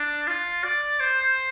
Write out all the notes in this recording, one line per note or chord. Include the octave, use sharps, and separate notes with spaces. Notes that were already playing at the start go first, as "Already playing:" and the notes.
Already playing: D4
F4
D5
C5